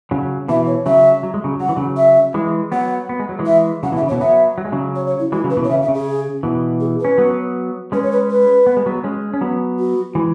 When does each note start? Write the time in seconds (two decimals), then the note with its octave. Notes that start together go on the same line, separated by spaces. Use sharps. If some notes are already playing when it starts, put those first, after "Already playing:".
0.11 C#3 F#3
0.48 B2 E3 E5
0.67 C#5
0.86 C#3 F#3 E5
1.23 F#3
1.34 G#3
1.44 C#3 F#3
1.60 F#3 F#5
1.69 E3
1.76 C#3 F#3
1.97 E5
2.34 E3 G#3
2.72 F#3 B3 F#5
3.09 B3
3.20 G#3
3.29 F#3
3.39 E3 G#3
3.46 E5
3.83 C#3 F#3 F#5
3.92 B2 E3
3.96 E5
4.02 C#3
4.08 C#5
4.11 B2 E3
4.21 F#3 B3 E5
4.58 F#3
4.65 G#3
4.72 C#3 F#3
4.95 C#5
5.07 C#5
5.19 E4
5.32 E3 G#3 F#4
5.44 C#3 F#3
5.50 B4
5.57 B2 E3
5.64 C#5
5.69 C#3 E5
5.82 E5
5.88 C#3
5.94 G#4
6.43 B2 E3
6.80 G#4
7.00 C#4 B4
7.18 F#3 B3
7.92 G#3 C#4 B4
8.03 C#5
8.12 B4
8.30 B4
8.67 B3
8.77 G#3
8.86 F#3 B3
9.04 G#3 C#4
9.34 C#4
9.41 F#3 B3
9.79 F#4
10.15 E3 G#3